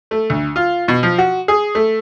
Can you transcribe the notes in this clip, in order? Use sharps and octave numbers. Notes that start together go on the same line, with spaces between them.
A3
D2
F4
B2
F3
F#4
G#4
A3